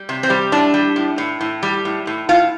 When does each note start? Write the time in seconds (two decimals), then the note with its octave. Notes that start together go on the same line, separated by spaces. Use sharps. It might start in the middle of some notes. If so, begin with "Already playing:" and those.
Already playing: G3
0.09 C3
0.23 C4
0.30 G3
0.52 A2 D4
0.74 G3
0.96 A2
1.18 A2
1.41 A2
1.63 G3
1.85 A2
2.07 A2
2.29 A2 F4